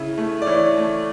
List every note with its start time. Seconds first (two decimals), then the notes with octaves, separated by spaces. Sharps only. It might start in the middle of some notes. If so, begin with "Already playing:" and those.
Already playing: C#3 E4
0.18 A3
0.42 D5
0.46 E3 C#5
0.77 A3